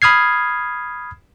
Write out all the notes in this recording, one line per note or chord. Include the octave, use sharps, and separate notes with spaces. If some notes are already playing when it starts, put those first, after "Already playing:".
B5 D#6 F6 G#6 C7